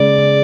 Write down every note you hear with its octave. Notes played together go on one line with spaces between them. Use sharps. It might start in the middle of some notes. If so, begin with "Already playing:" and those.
Already playing: C#3 G#3 D5